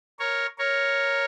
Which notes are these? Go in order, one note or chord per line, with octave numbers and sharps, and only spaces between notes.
A#4 C#5
A#4 C#5